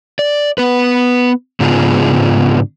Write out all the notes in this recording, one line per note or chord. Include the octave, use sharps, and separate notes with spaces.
D5
B3 B4
G#2 C#3 B3 D4 F4 G#4